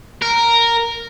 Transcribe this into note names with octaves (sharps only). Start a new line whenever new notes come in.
A#4